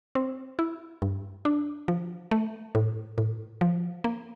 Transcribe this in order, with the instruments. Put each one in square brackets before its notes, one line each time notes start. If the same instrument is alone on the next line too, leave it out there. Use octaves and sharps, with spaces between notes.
[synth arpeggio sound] C4
E4
G2
D4
F3
A3
A2
A2
F3
A#3